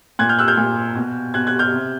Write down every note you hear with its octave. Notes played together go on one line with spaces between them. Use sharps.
A#2 F#6 G#6
F6 G6
E6 F#6
F6 G6
A#2
B2
B2 F#6 G#6
F#6 G#6
F6 G6
C3